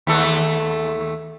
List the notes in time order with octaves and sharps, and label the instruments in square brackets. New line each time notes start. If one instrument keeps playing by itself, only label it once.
[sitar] D#2 A3 A4